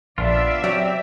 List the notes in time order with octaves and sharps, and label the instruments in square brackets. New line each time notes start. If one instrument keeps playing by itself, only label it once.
[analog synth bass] A#1 [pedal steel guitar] B3 D4 F4 [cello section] D5 E5
[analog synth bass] F#3 [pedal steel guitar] C4 G4